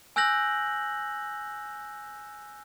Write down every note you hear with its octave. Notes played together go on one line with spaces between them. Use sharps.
G#5 E6 F#6 G6 A#6 F#7